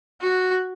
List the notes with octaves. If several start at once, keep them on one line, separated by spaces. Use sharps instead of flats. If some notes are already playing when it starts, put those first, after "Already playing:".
F#4